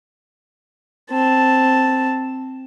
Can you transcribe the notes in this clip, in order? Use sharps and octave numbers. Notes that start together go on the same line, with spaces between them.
C4 A5